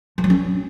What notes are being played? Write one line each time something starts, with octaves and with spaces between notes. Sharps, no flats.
F3
F#3
C#4